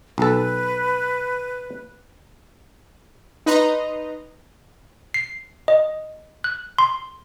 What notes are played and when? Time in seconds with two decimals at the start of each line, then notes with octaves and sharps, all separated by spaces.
0.18 B1 A4 B4
3.46 D#4 B4 D#5 A#5 C6
5.14 C7
5.68 D#5
6.44 F#6
6.78 C6